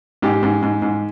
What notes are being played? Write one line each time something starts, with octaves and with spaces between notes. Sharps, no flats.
G#2 G4
G#2
G#2
G#2